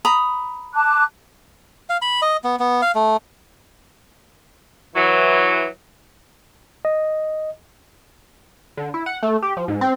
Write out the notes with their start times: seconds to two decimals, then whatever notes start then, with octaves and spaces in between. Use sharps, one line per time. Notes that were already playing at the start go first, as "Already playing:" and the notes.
0.05 A#5 B5 D#6
0.74 A5 D6 F#6
1.89 F5
2.02 B5
2.22 D#5
2.44 B3
2.60 B3
2.82 F5
2.95 A3
4.95 E3 F#3
6.85 D#5
8.77 D3
8.94 E4
9.06 F#5
9.23 A3
9.43 G4
9.57 F3
9.68 G#2
9.81 C4